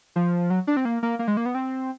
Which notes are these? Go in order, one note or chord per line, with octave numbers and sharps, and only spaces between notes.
F3
F#3
D4
C4
A#3
A#3
A#3
G#3
A#3
B3
C4